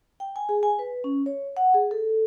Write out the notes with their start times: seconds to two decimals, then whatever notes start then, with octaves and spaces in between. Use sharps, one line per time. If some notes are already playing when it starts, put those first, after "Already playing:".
0.20 G5
0.36 G#5
0.49 G#4
0.63 G#5
0.79 B4
1.04 C#4
1.26 C#5
1.57 F#5
1.74 G#4
1.91 A4